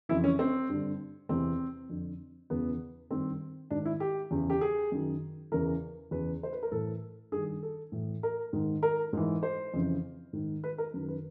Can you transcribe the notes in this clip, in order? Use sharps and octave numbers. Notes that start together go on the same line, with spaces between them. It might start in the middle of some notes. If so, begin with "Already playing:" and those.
F2 C#3 E3 E4
C#4
C4
G2 D3
E2 C3 E3 C4
F2 D3
E2 C#3 E3 B3
G2 D#3 C4
G#2 D#3 D4
E4
G4
E2 C#3 E3
G4
G#4
F#2 D#3
E2 C#3 E3 A#4
E2 C#3 E3 B4
C5
B4
A#4
A2 E3 A4
G2 D#3 G#4
A4
A2 E3
A#4
G#2 D#3
A#4
G#2 E3
C5
F2 C#3 E3
G#2 D#3
B4
A#4
F#2 D#3
B4